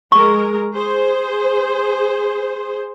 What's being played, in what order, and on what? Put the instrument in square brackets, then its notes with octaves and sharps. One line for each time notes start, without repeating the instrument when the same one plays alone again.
[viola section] G#3 G#4 A#4 [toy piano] C#6
[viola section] G#4 C5